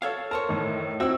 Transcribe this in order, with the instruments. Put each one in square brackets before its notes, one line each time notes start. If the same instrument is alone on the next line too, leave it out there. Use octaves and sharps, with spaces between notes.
[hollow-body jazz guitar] A4 C#5 F5
[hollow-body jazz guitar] A#4 C5 C#5 [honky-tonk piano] A5
[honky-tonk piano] A2 D#3
[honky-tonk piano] C4 E6 [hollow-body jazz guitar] E4 F#4